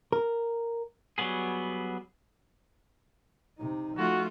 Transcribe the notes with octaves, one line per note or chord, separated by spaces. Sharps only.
A#4
F#3 G3 B3 G#4
C3 D#4
F3 A3 F4 F#4